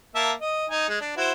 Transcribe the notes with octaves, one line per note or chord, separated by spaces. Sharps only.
A#3 E5 A5
D#5
D#4 G#5
G#3
D4
E4 F#4 C5